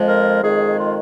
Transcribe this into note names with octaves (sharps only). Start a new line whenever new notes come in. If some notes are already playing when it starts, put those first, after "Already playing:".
Already playing: F2 F3 G#3
A#4
F2 D#3 G#3 G#4
F4